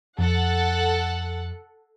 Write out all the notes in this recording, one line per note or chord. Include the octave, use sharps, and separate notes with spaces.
F2 A4 F#5